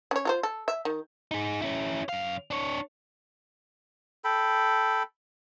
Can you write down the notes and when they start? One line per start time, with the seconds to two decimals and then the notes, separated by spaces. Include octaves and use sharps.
0.11 C#4 C#5
0.25 F4 A4 C5
0.43 A4
0.68 E5
0.85 D#3
1.31 D#4 G#4
1.62 C#4 E4
2.09 F#2 F5
2.51 D4 C#5
4.24 A4 G5 B5